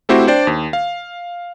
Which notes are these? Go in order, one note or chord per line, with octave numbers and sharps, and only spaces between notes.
A3 C4 E4 F#4 G4 C5
D4 C5 D5 G5
D#2
F5